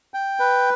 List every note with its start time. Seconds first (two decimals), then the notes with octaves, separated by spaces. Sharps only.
0.14 G5
0.40 B4